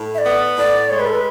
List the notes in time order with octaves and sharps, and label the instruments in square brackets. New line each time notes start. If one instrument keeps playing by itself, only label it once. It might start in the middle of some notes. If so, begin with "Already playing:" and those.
Already playing: [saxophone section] A2
[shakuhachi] E5
D5
[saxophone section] B3
[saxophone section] A2 [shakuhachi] D5
[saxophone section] G#3 [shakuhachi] C#5
[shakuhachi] B4
A4
B4